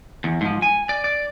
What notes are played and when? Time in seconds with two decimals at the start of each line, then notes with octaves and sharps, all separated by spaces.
0.24 E2
0.41 G#2 F3
0.62 G#5
0.89 D5
1.04 D5